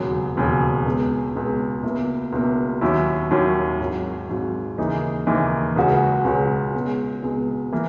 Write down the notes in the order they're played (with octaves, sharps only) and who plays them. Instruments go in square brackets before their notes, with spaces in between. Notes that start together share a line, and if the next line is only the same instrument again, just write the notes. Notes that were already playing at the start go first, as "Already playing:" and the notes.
Already playing: [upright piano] E1 D#2 C#3 F#3
E1 D#2 C#3 F#3
C#2 B2 G#3
C#2 B2 G#3
C#2 B2 A#3 E4
C#2 B2 A#3 E4
D#2 D#3 F#3 C#4 E4
D#2 D#3 F#3 C#4 E4
G#1 G#2 F#3
G#1 G#2 F#3
D#2 C#3 E3 A#3 D#4
D#2 C#3 E3 A#3 D#4
C#2 C#3 G#3 C#4 F#4
C#2 C#3 G#3 C#4 F#4
C#2 B2 G#3
C#2 B2 G#3
E3 A#3